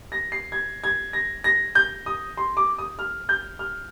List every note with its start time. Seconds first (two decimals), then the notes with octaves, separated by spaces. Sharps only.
0.12 A#6
0.32 C7
0.52 G#6
0.84 G#6
1.13 A#6
1.44 A#6
1.75 G6
2.06 D#6
2.37 C6
2.57 D6
2.78 D#6
2.99 F6
3.29 G6
3.59 F6